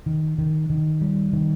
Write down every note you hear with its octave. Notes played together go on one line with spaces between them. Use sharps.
D#3
D#3
D#3
G3
D#3